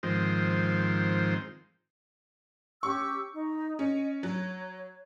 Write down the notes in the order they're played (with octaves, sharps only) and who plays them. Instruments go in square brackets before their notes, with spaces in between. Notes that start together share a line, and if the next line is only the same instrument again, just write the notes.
[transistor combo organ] G#2 D#3 F3 C4
[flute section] C#4 G4 E6 [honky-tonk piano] C#6
[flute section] D#4
[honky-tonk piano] C#4 [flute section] D#5
[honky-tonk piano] F#3 [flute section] C#5